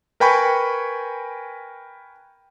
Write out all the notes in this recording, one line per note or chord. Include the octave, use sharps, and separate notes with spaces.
A#4 B4 G5 G#5 B5 C#6